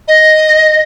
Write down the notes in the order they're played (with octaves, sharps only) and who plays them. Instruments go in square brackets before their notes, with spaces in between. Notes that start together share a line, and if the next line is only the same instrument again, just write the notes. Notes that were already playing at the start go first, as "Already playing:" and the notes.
[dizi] D#5